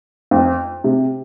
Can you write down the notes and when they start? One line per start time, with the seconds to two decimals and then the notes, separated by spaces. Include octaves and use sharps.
0.31 F2
0.84 C3